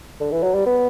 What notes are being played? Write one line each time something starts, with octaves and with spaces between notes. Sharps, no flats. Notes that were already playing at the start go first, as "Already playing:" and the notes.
D3
E3
F#3
G3
B3